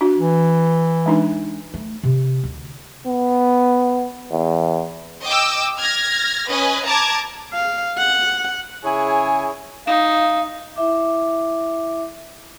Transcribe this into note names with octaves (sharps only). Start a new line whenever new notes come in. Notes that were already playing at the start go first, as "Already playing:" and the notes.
D4 F#4
E3
G#3 D4 D#4
A3
C3
D2
B3
E2
D#5 G5 D6 E6
F6 G#6 A#6
C#4 B4 D#5 G#5
A5 A#5 D6 G#6
F5
F#5
C#3 E4 G#4 C#5 G#5
D#4 F5
E4 E5 D6